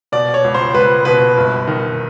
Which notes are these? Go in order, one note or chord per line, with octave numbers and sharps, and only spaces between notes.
B2 D5
C#5
C#2
C5
C#2 B4
B2 B4
G1
D#3